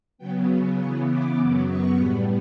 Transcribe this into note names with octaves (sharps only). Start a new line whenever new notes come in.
C#3 F#3 B3 G5
C#3 E3 B3 C#6
D6
F#2 C#3 F#3 B3 D6
C#6
A2 G3 B3 B5